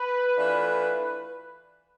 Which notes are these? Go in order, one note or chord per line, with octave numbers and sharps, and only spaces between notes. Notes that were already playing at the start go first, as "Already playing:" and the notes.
Already playing: B4
E3 A3 D4 F4